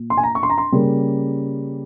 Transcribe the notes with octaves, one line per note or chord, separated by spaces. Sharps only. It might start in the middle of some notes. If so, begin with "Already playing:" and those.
Already playing: A#2
C6
G#5
A#5
C#6
C6
A#5
C6
C#3 G3 A#3 C#4